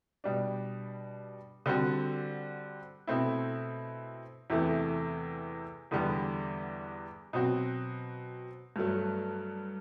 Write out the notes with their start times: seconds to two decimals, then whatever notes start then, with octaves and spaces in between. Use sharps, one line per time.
0.24 B2 G3 D4
1.66 D3 G3 C4 F#4
3.07 B2 A3 C4 E4
4.50 E2 C3 E3 A3
5.91 E2 D3 G3 B3
7.33 B2 F#3 C4 F#4
8.76 G2 F#3 A3